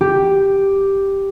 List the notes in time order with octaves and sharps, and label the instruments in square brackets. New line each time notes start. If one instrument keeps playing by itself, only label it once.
[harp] G4